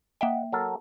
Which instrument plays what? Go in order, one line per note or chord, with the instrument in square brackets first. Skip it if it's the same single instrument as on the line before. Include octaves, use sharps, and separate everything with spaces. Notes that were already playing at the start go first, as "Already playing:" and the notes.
[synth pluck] A#3 E5 G5 [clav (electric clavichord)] D#5 F#5
[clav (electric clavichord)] F#3 A4 A#4